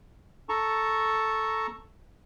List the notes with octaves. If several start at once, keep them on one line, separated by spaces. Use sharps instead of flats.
A4 A5 A#5 C#6